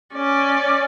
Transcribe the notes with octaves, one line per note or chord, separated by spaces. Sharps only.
C#4 D5